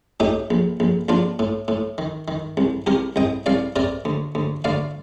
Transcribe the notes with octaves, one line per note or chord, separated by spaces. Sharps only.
A2 D#4 G4
A#1
A#1
A#1 D4 F4
A2
A2
D#3
D#3
C2
C2 G4 A#4
C2 D#5 G5
C2 D5 F5
C3 A#4 D5
D2
D2
D2 D5 F5